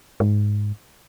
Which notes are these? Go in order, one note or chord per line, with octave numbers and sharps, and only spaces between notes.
G#2